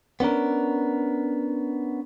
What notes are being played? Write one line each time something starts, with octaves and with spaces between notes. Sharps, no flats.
B3 C#4 D4 A#4